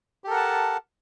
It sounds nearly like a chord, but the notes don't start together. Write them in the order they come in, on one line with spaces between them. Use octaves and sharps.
G4 A4 A#4 F#5 A5